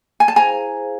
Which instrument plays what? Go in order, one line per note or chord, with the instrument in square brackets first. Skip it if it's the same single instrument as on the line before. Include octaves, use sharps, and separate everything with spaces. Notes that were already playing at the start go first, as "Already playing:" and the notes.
[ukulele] G#5
A5
[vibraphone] E4 G#4 C5 F5 [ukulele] G#5 A#5